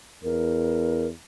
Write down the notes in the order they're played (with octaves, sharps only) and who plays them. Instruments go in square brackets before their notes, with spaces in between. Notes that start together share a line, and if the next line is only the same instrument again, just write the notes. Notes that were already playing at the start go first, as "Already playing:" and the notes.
[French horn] E2 [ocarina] A#4